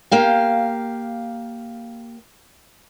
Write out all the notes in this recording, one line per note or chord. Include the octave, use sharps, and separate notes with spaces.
A#3 G4 F5